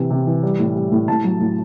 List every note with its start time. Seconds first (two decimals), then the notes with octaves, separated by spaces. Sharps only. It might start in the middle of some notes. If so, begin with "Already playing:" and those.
Already playing: C3 E3
0.10 C3
0.26 E3
0.43 G3
0.59 A2
0.75 G3
0.92 A2
1.08 A2 A5
1.24 F#3
1.40 A2